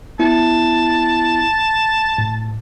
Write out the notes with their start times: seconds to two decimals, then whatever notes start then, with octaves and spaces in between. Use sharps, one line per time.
0.19 B3 E4 A5
2.18 A2